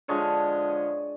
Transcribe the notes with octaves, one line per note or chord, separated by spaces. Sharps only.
D3 F3 G#3 C#5 D#5